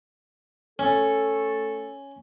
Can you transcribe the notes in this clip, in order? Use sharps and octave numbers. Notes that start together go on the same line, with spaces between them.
A3 C#4 A4